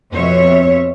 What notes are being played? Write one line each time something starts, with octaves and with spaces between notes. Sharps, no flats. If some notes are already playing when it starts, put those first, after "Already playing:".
F2 B2 C4 C#5 E5